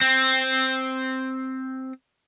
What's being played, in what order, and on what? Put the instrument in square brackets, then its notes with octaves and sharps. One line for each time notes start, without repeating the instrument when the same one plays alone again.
[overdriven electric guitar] C4